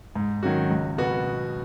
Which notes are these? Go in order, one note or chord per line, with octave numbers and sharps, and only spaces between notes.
G#2
D#3 F#3 C#4 F#4
C#2
B2 B3 F#4